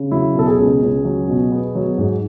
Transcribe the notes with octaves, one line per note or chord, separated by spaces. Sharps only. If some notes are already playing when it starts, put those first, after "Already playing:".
Already playing: C#3
F#3 E4
B2 A4
G#4
C#2
C#2
F#3
B2
B3
F#3
G#2